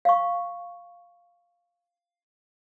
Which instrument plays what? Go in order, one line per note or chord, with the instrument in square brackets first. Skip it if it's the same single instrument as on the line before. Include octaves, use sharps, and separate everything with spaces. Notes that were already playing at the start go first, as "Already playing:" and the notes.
[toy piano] F5 C#6